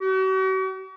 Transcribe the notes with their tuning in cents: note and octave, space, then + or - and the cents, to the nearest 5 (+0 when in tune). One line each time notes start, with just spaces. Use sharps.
F#4 +45